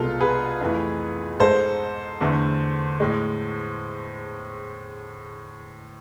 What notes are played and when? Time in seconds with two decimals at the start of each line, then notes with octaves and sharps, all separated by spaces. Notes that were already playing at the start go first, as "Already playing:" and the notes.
Already playing: C2 B2 G#3 F4 A4
0.20 G#4 B4
0.61 F2 E3 A3
1.40 G#2 G#3 A4 C5
2.21 E2 D3 A3
3.00 A2 G#3